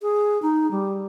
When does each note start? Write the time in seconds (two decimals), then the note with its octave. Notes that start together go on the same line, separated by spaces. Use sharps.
0.02 G#4
0.42 D#4
0.71 G3